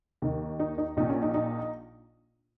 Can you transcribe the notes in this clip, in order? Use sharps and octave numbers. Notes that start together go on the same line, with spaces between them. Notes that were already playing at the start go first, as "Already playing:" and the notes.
D#2 D#3
D#4
D#4
A#1 A#2 D#4
C#4
D#4
D#4